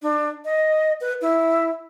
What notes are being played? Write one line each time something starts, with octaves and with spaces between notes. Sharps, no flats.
D4
D#5
B4
E4